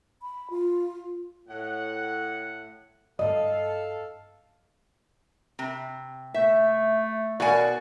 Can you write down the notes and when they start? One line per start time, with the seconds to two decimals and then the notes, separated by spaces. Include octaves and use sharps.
0.22 B5
0.50 F4
1.47 A2 F#5
3.19 G2 E4 A4 D#5 F5
5.59 C3
6.34 A3 E5
7.40 B2 F#4 A#4 C#5 D5 F5 G#5